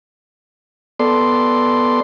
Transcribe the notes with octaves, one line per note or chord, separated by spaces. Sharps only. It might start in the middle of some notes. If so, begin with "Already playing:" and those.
B3 A4 D5 C6